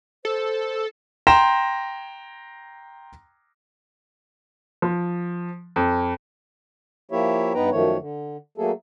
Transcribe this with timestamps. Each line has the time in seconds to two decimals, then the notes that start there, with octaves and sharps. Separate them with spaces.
0.25 A4 C5
1.27 G5 A#5 C6 A#6 E7
4.82 F3
5.76 F2
7.11 F3 A#3 E4 G4 C#5 E5
7.54 G2 B3 D#4 B4 G5 A#5
7.72 F#2 D#3 F3 A3 C#5
7.99 D3
8.58 F#3 A3 A#3 G#4 A4